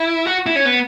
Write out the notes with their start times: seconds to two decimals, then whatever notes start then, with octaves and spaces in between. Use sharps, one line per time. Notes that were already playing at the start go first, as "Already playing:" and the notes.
Already playing: E4
0.27 F#4
0.46 E4
0.56 C#4
0.65 B3